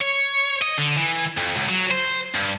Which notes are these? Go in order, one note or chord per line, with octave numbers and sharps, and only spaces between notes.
C#5
D#5
D3
E3
F2
C#2
F#3
C5
G2